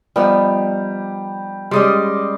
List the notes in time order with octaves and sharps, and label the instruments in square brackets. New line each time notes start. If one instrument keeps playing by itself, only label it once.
[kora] F3 B3 D#4 [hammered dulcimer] G3
[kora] G3 G#3 C#4 [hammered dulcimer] D5 D#5 C6